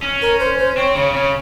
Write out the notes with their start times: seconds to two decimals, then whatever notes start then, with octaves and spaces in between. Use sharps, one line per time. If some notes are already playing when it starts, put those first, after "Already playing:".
0.02 C#4
0.22 A#4
0.40 C5
0.58 C5
0.77 C4 C#5
0.95 C#3 C#5
1.14 C#3 C#5